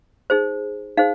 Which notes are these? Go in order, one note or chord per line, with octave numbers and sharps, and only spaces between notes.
D#4 G#4 C5
D#4 G#4 C5 F5